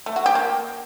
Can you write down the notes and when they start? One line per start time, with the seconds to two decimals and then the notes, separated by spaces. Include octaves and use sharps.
0.06 A3
0.16 F#4
0.26 G4
0.35 A#3